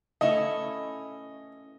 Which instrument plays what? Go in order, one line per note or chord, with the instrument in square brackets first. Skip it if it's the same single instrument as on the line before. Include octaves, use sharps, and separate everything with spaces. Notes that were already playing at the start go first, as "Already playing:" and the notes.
[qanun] A3 C#4 E4 [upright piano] D#5